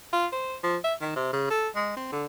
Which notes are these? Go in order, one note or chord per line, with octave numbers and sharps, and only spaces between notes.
F4
C5
F3
E5
D#3
C3
C#3
A4
G#3
C4
D3